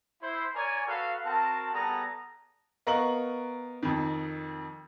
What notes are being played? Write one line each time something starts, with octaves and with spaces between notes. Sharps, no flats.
E4 C5
A#4 C#5 D5 G#5
F#4 A4 B4 F5
C4 F#4 A#4 A5
G3 B3 G#4 A4 A5 A#5
B3 A#4 D#5 F5 C#6 F#7
F2 D#3